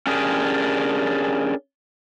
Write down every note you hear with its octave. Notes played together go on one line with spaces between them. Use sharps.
C#4 D4 G4 G#4 A#4